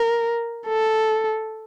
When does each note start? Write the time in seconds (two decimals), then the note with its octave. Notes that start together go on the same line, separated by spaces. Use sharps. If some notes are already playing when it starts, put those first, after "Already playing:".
Already playing: A#4
0.67 A4